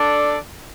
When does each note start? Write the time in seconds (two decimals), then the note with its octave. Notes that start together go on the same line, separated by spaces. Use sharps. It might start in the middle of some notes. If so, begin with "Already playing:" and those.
Already playing: D4 A4 D5